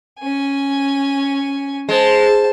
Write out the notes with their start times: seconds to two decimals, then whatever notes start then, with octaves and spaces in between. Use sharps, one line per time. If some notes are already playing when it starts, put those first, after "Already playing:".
0.20 C#4 G#5
1.89 G#3 C5 A5